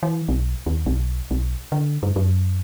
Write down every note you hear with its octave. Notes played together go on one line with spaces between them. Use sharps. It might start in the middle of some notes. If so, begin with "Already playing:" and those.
E3
B1
D#2
B1
B1
D3
G2
F#2